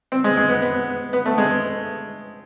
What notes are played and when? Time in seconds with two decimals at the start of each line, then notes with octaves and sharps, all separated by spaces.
0.12 C4
0.24 G#3
0.37 G#3
0.49 B3
0.62 B3
1.13 B3
1.26 A3
1.38 G#3